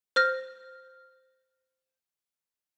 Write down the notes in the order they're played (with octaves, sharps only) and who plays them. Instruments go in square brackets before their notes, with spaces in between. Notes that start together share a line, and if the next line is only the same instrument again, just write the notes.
[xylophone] C5 F6 A#6